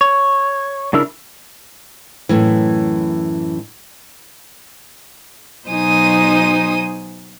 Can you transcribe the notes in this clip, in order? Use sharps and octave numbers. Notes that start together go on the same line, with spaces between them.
C#5
C#3 D4 E4 A#4 E6
F#2 A2 E3
B2 F#3 D#4 C5 G#5 D#6